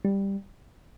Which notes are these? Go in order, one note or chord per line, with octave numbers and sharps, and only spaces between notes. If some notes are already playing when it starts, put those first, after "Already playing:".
G3